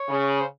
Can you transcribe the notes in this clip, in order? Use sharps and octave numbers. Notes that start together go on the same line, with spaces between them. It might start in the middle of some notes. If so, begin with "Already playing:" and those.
Already playing: C#5
C#3
C5